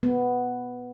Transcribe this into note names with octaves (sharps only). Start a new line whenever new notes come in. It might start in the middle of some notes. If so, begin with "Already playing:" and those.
B3